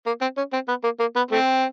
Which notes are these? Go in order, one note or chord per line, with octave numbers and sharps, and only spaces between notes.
A#3
C4
C#4
C4
B3
A#3
A#3
B3
A3 C4